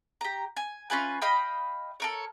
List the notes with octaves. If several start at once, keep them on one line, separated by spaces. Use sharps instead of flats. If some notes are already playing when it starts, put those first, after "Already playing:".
G4 A#5
G#5
C#4 F4 B4 G#5
D#5 F5 G5 B5
A4 A#4 C#5